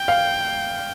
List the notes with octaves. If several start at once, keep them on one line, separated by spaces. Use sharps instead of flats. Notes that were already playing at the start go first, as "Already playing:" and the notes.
Already playing: G5
F5